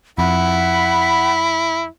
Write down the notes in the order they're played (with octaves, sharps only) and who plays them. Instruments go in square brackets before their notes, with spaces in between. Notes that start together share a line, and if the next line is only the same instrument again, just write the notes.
[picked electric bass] F2 [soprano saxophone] E4 [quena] F#5 [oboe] B5